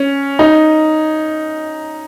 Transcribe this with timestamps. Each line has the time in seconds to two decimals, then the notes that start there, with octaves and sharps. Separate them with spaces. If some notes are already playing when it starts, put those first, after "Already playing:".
Already playing: C#4
0.39 D#4